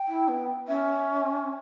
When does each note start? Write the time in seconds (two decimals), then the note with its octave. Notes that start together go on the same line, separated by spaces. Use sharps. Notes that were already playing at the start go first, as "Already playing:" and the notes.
Already playing: G5
0.08 E4
0.28 B3
0.68 C#4 E5